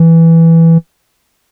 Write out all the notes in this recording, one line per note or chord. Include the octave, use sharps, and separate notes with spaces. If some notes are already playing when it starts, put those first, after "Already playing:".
Already playing: E3